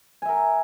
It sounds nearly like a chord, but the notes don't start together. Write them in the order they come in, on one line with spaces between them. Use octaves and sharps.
G#5 E5 A#4